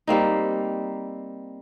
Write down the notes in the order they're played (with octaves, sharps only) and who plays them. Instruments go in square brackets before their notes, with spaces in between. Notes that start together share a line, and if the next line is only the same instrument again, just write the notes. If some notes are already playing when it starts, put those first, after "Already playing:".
[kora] G3 A#3 C4 D#4